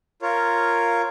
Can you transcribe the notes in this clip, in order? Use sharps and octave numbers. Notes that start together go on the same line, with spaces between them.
F4 A#4 C#5